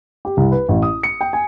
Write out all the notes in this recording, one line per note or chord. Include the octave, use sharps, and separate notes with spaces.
G4
C2
B4
A1
D#6
C#7
G5
G#5